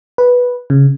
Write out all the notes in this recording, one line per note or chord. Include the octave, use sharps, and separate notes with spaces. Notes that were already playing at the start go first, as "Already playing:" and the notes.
B4
C#3